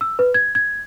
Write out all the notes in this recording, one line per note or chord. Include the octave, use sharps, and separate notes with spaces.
E6
B4
G#6
G#6